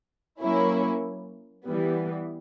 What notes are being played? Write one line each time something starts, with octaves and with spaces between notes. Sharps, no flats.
F#3 A#3 C#4 E4
E3 G3 B3